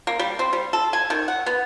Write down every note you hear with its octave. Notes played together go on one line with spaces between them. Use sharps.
A#3
G3
C4
G3
A4
G#5
D#3
F#5
B3